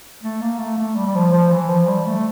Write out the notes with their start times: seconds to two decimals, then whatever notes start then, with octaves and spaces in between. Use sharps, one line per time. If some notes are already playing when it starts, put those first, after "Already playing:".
0.23 A3
0.41 A#3
0.59 A3
0.78 A3
0.96 G3
1.07 G3
1.15 F3
1.33 F3
1.51 E3
1.69 F3
1.87 G3
2.07 A3